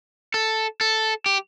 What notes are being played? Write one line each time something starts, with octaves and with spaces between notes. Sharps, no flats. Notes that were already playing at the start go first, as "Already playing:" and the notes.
A4
A4
G4